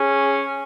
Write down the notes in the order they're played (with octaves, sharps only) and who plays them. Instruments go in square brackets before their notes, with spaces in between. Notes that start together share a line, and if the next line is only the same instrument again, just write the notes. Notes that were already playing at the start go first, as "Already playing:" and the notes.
Already playing: [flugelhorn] C#4 [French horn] G#4